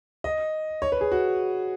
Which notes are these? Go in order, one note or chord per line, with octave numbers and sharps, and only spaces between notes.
D#5
C#5
B4
G#4
F#4